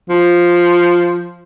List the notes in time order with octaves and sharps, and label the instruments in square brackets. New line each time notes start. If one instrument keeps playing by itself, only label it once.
[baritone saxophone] F3